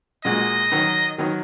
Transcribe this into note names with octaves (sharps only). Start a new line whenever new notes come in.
A#2 G#3 F#4 D#5
D#3 F#3 D#4
D#3 F#3 D#4